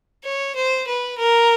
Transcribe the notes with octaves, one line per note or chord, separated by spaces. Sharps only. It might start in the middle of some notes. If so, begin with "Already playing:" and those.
C#5
C5
B4
A#4